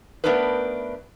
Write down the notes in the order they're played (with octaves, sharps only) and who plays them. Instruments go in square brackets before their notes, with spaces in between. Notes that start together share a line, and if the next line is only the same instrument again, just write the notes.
[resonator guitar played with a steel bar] A3 B3 D4 D#4 A#4 B4